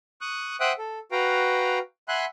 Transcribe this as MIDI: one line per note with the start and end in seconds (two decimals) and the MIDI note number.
0.21 0.56 85
0.21 0.56 87
0.21 0.56 90
0.60 0.72 72
0.60 0.72 76
0.60 0.72 78
0.60 0.72 79
0.60 0.72 87
0.60 0.72 90
0.78 0.99 69
1.12 1.79 66
1.12 1.79 71
1.12 1.79 77
1.12 1.79 79
1.12 1.79 82
2.08 2.25 76
2.08 2.25 78
2.08 2.25 80
2.08 2.25 83
2.08 2.25 84
2.08 2.25 90